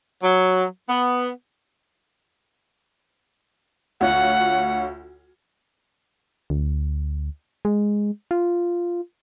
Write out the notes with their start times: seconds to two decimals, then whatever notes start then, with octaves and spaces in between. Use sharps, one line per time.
0.23 F#3
0.89 B3
4.01 D2 F4 C#5 F#5
6.50 D2
7.65 G#3
8.31 F4